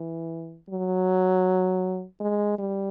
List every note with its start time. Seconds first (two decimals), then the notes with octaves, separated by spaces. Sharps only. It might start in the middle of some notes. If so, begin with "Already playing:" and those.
Already playing: E3
0.69 F#3
2.21 G#3
2.59 G3